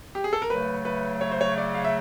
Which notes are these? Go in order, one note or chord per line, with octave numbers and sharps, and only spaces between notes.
G4
G#4
A4
A#4
C#3 F#3 A3 B4
B4
C#5
C5
C#5
D5
F5
E5